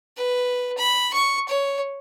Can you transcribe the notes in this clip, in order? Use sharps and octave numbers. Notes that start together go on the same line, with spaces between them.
B4
B5
C#6
C#5